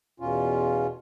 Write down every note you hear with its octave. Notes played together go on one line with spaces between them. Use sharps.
E2 B2 C#4 F4